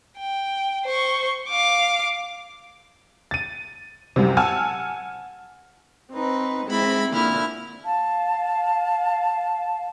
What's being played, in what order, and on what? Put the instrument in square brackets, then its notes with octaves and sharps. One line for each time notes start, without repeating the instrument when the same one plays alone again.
[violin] G5
C5 C#6
F5 D6
[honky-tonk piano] A6 D#7
C2 F#2 C3
F#5 G#5 A5 E6 F6
[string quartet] C4 D#4 B4
G#2 C4 E4 B5
A#2 D3 E4 F6
[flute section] F5 A5